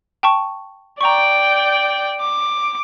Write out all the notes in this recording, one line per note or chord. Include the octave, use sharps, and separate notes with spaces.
G5 A5 C#6
D5 G5 A#5 C#6
D6